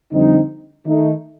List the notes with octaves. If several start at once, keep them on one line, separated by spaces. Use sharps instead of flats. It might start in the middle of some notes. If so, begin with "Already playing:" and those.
F2 D3 G3 C4 D#4
D#3 A3 D#4